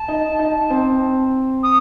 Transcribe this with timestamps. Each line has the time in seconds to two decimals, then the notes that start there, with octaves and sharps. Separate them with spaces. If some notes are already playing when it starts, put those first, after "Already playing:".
Already playing: A5
0.08 D#4
0.39 D#4
0.70 C4
1.63 D#6